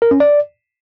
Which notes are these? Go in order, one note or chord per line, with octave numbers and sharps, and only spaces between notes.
A#4
C#4
D5